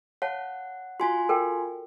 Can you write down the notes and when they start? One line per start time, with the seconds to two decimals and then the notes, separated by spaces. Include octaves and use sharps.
0.22 C#5 F5 F#5 A5
1.00 F4 F#4 G#5 C6
1.29 A4 A#4 G5